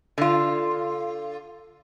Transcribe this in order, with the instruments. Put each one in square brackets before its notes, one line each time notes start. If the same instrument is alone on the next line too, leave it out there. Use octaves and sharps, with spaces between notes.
[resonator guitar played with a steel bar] D3 F4